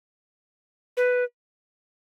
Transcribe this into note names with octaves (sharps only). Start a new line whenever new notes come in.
B4